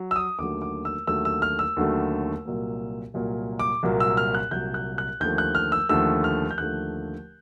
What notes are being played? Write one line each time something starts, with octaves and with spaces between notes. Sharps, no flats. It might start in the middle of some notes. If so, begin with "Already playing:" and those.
Already playing: F#3
E6
D#6
D#2 D3 F#3 A3 D6
D6
E6
D#2 D3 F#3 A3 E6
E6
F6
E6
D#2 D3 F#3 A3
C2 A#2 F#3 A#3
C2 A#2 F#3 A#3
D6
C2 A#2 F#3 A#3
E6
F6
F#6
C2 A#2 F#3 A#3 G6
F#6
F#6
D#2 D3 F3 A3 G6
F#6
F6
E6
D#2 D3 F3 A3 E6
F6
G6
D#2 D3 F3 A3 F#6